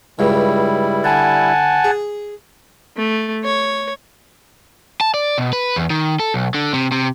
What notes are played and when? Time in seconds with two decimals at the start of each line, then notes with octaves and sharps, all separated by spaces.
0.19 C#2 G2 C#3 G3 E4
1.04 D3 F#5 G#5 A5
1.84 G#4
2.97 A3
3.44 C#5
5.01 A5
5.14 D5
5.38 B2
5.53 B4
5.76 E2
5.90 D#3
6.20 A4
6.34 B1
6.54 D3
6.74 C3
6.92 C3